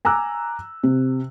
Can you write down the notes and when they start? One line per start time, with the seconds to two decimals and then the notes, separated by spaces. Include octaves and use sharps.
0.05 G#5 A#5 D6 E6 F#6
0.83 C3